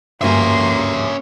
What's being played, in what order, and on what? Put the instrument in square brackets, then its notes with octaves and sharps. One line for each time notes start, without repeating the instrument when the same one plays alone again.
[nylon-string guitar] D2 G2 G#5 [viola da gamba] A#3 [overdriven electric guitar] C#4 E5 [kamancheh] C6